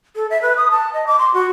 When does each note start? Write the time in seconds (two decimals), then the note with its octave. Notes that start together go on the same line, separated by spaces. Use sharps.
0.16 A4
0.30 E5
0.42 B4
0.57 D#6
0.71 A5
0.93 D#5
1.07 D6
1.19 C6
1.34 F#4